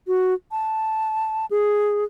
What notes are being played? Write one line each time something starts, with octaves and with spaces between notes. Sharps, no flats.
F#4
A5
G#4